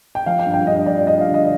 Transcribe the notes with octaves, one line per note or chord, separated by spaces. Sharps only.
G5
F3 F5
G5
G2
G5
G2 D#5
F3 D5
G2 D#5
F5
D3
D#5